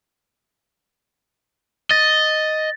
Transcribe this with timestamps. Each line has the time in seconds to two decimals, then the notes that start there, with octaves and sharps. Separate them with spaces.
1.91 D#5 A6 A#6